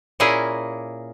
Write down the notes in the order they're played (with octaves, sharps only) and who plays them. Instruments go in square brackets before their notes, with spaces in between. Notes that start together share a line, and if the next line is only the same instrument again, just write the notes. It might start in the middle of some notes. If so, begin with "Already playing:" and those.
[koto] A#2 A#3 C#4 E4 G#4 G#5